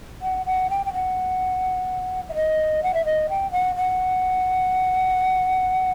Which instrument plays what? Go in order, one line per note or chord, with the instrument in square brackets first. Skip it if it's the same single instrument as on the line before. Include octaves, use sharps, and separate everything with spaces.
[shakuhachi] F#5
F#5
G5
G5
F#5
E5
D#5
F#5
E5
D#5
G5
F#5
F#5